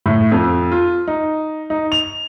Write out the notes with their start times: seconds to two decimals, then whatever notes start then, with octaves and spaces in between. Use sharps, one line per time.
0.06 A2
0.32 F2
0.72 F4
1.08 D#4
1.70 D#4
1.92 F7